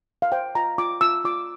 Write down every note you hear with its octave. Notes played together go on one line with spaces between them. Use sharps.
F5
C5 G5
F4 A#5
F4 D6
F4 E6
F4 D6